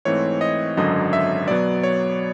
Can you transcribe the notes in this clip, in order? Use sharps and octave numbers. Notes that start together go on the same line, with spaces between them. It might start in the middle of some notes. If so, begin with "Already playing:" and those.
G#2 E3 A3 C4 C#5
D#5
G#1 F#2 D3 F#3 D#5
E5
B2 F#3 B3 D5
C#5